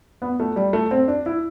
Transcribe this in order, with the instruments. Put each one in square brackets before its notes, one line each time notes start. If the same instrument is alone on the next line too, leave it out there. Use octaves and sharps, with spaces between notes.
[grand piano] B3
A3
G3
A3
C4
D4
E4